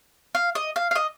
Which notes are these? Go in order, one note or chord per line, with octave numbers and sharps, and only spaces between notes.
F5
D#5
F5
F5
D#5